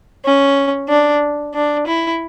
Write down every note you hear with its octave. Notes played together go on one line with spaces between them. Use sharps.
C#4
D4
D4
E4